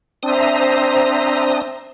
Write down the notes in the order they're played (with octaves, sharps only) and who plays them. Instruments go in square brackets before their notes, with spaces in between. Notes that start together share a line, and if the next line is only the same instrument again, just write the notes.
[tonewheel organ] C4 D4 D#6 [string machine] C5 E5 A#5